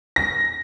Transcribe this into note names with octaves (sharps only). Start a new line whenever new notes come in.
A#6